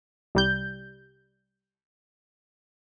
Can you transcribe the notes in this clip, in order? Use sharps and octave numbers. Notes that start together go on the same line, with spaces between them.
C2 G3 G6